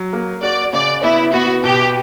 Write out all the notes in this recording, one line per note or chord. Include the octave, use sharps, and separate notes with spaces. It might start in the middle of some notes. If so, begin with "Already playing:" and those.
Already playing: F#3
A#3
F#4 D5
C#3 D5
B3 E4
B3 F#4
B2 G4